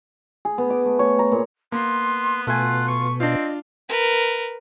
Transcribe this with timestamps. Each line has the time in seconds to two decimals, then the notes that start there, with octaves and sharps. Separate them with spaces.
0.45 G#4
0.58 B3
0.70 D6
0.85 A3
0.99 C#5
1.19 A#5
1.32 A#2
1.72 A#3 B3 C6
2.47 B2 A3 F4 F#5 G#5
2.88 C#6
3.20 C4 D4 F4 D#5
3.89 A#4 B4